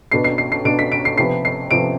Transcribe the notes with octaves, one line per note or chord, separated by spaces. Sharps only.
B2 B3 D4 C7
C7
C7
C7
B2 B3 D4 D7
B6
D7
C7
C3 F3 B3 C7
C7
C3 F3 B3 D7